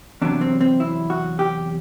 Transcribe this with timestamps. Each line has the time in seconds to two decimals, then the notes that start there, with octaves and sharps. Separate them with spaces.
0.22 E2 C3 F#3 D4
0.41 C4
0.61 C4
0.80 E4
1.10 F#4
1.39 G4